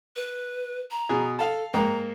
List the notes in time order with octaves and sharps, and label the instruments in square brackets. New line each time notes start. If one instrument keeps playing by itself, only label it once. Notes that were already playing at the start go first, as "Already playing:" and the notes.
[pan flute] B4
A#5
[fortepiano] B2 G#4
[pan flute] A4 [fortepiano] F5 A5
[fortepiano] G#2 A#3 G5 [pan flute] A#5